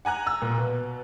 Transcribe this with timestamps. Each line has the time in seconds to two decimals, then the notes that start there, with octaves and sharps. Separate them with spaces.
0.05 F#5 G#5 A#5 F#6
0.26 A#5 E6
0.42 A#2
0.58 B2